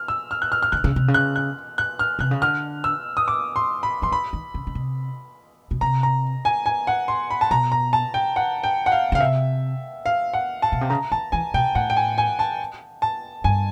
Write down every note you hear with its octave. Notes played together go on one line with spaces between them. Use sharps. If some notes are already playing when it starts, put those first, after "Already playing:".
Already playing: F6
E6
F6
F#6
F6
F6
D3 F#6
C#3
C3
C#3
F#6
F#6
F#6
F6
C3 F#6
C#3
D3 F6
E6
D#6
D6
C6
B5
E3 C6
D#3 B5
D#3
C#3
C#3
C3
B2
C3 A#5
A#5
G#5
G#5
F#5
C6
B5
A5
B2 A#5
A#5
A5
G5
F#5
G5
F#5
F5
C#3 F5
C3 E5
F5
F#5
A5
B2
C3
C#3 A#5
D#3 A5
E3 G#5
B2 G5
A2 F#5
G5
G#5
G#5
A5
A5
G2 G#5